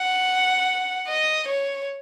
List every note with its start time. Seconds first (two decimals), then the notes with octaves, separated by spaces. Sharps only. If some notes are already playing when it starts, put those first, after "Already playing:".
Already playing: F#5
1.08 D#5
1.49 C#5